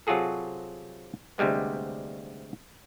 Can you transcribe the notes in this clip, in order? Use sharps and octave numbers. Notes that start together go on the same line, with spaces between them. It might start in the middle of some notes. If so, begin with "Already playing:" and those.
C3 F#3 F4 F#4 G#4 A4
D2 C3 G3 G#3 B3